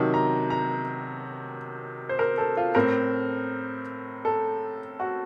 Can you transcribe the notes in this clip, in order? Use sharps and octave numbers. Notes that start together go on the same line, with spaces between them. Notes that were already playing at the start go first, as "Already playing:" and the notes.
Already playing: C3 D#3 F#3 A5
A#5
A#5
C5
A#4
A4
F4
A2 A3 C4 A#4
A4
F#4